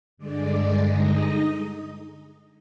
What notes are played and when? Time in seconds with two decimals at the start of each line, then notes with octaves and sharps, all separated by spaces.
0.17 G2 D3 G#3 D5
0.83 D#4 D#5